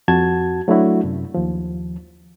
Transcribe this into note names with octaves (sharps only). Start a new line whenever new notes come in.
F2 F#4 A5 G#6
F#3 A3 D4 E4 F#4
F#2 C3
D#2 F3